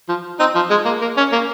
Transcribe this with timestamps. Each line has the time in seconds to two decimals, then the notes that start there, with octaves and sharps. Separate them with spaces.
0.09 F3
0.40 C4 D#4
0.55 F3
0.71 G#3
0.86 A#3
1.02 A#3
1.18 C#4
1.33 A#3